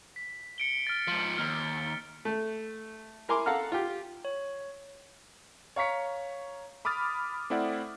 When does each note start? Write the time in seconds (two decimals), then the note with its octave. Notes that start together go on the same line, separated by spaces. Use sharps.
0.16 B6
0.58 C#7 D7 G7
0.87 F6 A6
1.08 G#2 F3
1.38 D#2 F6
2.25 A3
3.29 E4 A#4 G#5 C6 D6
3.46 A4 F5 F#5 A#5 F6
3.72 F4 G4
4.25 C#5
5.76 C#5 F5 A#5 C#6 B6 C#7
6.85 B5 D6 D#6 F6 A6
7.50 A3 C4 E4 D5 F#5